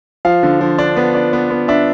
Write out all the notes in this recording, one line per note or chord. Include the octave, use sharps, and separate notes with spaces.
F3 F5
D3
F3
D4
B3
D4
B3
B3
D4 E5